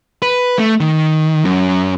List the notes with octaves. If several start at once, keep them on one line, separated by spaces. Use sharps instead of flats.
B4
A3
D#3
F#2